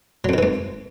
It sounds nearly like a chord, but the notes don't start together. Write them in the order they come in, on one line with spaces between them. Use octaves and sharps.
F#3 F2 D#3 E3 G#2